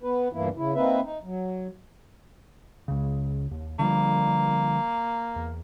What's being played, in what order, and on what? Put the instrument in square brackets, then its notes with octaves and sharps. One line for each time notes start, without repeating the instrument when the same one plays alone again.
[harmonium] B3 B4
D2 G2 A#2 E3 A#3 E4
C#3 E4
A#3 C4 D#4 B4 E5
D#4
F#3
[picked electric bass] C#2 C#3
D#2
[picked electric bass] D3 F3 G3 [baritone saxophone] A#3
[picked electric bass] E2